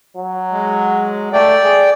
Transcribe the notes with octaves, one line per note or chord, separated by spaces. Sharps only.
F#3
G#3
A3 D5 G5
G#4